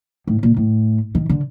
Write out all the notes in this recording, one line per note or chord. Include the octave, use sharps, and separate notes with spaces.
A2
A#2
A2
D#3
D3